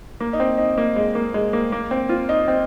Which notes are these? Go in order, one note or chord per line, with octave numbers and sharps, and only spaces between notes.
A#3
D#4
C4
D#4
A#3
G#3
A#3
G#3
A#3
A#3
C4
F4
D#4
C4